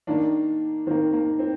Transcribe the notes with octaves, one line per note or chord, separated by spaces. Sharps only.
D#3 A#3 D4
D#3 A#3 C4
A#3
C4